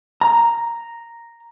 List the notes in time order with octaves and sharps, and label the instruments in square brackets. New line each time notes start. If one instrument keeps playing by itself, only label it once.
[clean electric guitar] A#5